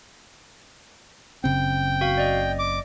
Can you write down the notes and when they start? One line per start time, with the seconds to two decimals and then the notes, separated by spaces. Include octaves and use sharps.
1.44 F#1 C#3 C4 G5
2.01 F#4 F5
2.18 D5 D#5
2.59 D6